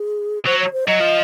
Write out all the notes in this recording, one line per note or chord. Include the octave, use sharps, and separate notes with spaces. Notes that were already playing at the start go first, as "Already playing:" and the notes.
Already playing: G#4
F#3 C5
C#5
C5
F#3 D#5
F3